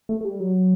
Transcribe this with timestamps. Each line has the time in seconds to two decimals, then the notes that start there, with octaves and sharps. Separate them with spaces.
0.09 A3
0.21 A3
0.25 G3
0.40 F#3